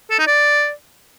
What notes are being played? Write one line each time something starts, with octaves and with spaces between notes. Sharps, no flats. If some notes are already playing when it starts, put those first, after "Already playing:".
A4
D#4
D5